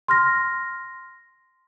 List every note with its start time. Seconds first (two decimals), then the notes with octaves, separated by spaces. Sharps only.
0.08 C6 F6 A#6